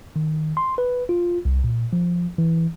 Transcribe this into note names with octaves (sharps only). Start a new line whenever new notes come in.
D#3
C6
B4
F4
C2
A#2
F3
E3